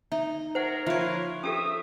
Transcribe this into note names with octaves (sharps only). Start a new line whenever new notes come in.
D#4 E5
A#4 C5 C#5 F#5 A#5
F3 A#4 B4 C#5 E5 F5
C#4 G4 A4 E5 D#6